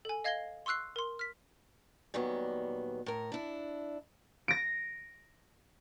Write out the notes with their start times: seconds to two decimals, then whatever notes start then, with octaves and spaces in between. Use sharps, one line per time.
0.05 A4 G#5
0.24 D#5 F5 G#6 A#6 C7 G7
0.66 C6 C#6 E6 F#6 C7
0.96 A#4 C6
1.19 F6 B6
2.14 A#2 D#3 F#3 G3 B3
3.06 A2 A#4
3.32 D4 E4
4.48 A#6 D7